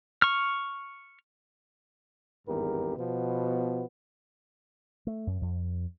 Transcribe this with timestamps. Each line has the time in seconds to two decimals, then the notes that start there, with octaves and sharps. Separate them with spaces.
0.22 C#6 F6
2.47 G#1 E2 G2 G4 A#4
2.97 B2 F3 B3
5.07 A3
5.27 F#2
5.41 F2